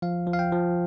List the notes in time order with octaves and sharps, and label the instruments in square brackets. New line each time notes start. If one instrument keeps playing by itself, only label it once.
[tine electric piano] F3 F5
F3
F5
G5
F3